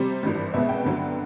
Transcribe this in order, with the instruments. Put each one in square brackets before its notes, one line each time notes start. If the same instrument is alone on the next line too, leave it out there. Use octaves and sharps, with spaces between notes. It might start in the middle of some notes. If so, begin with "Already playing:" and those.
Already playing: [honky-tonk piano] C3 G3 C5
G#1 G2 E3 G3
C2 B2 G#3 B3 E5
G5
G2 D3 F#3 B3